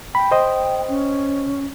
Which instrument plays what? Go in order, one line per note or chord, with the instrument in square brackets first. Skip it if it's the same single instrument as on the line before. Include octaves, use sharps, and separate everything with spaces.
[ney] G5 [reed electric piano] B5
[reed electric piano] C5 D#5
[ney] C#4